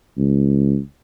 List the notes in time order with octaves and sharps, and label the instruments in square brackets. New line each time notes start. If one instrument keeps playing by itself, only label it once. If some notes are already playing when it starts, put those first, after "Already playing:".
[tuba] C#2